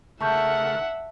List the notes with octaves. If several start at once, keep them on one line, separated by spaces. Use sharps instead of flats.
C#3 A3 A#4 E5 F#5 A5 C#6 G6